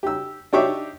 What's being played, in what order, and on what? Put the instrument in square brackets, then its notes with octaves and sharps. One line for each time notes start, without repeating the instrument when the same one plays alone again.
[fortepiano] G4 E6
D4 D#4 G4 C#5 E5 D6